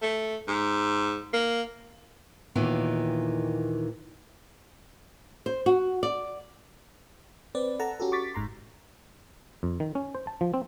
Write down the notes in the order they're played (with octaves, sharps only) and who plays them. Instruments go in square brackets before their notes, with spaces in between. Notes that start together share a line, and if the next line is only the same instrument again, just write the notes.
[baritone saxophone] A3
G#2
A#3
[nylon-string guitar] D#2 A#2 D#3 E3 B3
C5
F#4
D5
[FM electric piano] C4 B4 D5
A4 F#5 A5 A#5
C#4 F#4 G4 A4
C#6 D6 A6 B6
G1 G#2 A#5 C6
[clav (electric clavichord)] F2
D#3
C#4
C5
A5
F3
C4